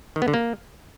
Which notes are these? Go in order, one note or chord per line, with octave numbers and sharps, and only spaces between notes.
D#3
B3
D3
A#3